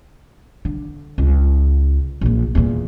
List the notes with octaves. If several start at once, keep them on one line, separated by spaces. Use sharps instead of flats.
D3
C#2
A#1 A#2
E2 A#2